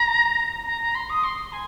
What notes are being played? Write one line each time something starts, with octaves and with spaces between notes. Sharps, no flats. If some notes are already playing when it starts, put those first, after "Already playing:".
Already playing: A#5
A#5
A#5
C6
D#6
C6
G#5